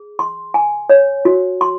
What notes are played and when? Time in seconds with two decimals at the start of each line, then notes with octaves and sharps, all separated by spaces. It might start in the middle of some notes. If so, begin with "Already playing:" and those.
Already playing: G#4
0.19 C6
0.54 G#5
0.89 C#5
1.25 F#4
1.61 C6